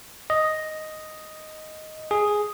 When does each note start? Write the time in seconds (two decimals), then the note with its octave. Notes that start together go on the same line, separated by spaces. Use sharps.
0.30 D#5
2.11 G#4